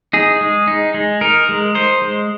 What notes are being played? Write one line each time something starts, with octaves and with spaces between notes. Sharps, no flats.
D#4 G#4
G#3
D#4
G#3
D#4 A#4
G#3
D#4 C5
G#3